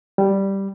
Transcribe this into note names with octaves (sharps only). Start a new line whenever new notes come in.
G3